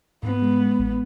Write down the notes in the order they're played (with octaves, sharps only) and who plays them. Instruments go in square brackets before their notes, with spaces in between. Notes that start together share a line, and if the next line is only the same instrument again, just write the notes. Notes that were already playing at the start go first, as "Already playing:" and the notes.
[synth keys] G#2 [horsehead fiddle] B3
[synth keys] G#3
G#3
A1